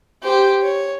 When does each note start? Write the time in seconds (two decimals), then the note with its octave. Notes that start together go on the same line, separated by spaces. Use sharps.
0.23 G4 C5
0.62 C#5